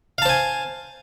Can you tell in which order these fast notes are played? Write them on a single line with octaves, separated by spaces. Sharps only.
F5 A5 C5 G#5